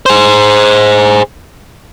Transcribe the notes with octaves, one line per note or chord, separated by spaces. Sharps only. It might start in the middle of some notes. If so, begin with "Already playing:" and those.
G#4 C5